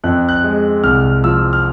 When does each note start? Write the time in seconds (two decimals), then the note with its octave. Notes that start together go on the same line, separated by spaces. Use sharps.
0.04 F2 F#6
0.29 F#6
0.44 G#3
0.83 C2 F6
1.24 F3 E6
1.53 F6